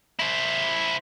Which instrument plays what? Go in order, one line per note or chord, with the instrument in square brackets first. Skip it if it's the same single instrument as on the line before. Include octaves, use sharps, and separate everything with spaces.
[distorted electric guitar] E4 C5